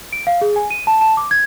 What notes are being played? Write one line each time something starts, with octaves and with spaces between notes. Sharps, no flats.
D7
F5
G#4
G#5
D#7
A5
A5
D6
G#6